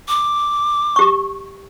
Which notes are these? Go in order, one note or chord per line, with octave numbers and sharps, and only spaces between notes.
D6
G4 C#6